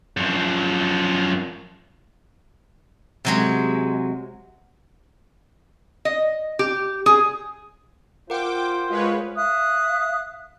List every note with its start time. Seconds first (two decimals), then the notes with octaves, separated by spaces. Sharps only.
0.17 F#2 F3
3.25 C3 F#3 G#3
6.05 D#5
6.59 G4
7.06 G#4
8.30 F4 A#4 C5 F#5 G5 D6
8.90 G#3 F4 B4 C#5
9.36 E5 F5 D#6 F#6